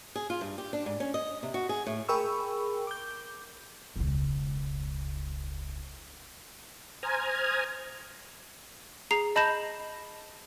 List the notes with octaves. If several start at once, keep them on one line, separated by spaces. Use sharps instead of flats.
G#4
F4
G2
G4
D4
G#2
C#4
D#5
C3
F#4
G#4
A2
G#4 A#4 G5 B5 C#6 E6
D6 G6
E1 C#2
C5 G#5 A#5 D#6 F6 G#6
G#4 A#5 C7 F7
D#5 A5 B5 G6 A#6 E7